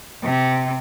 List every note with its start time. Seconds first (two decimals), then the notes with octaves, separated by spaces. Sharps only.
0.23 C3